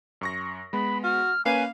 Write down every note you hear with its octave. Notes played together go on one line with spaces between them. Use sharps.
F#2 C#6 A#6
G#3 B3 B5
F#4 F6
A#3 C#4 B4 F5 G#5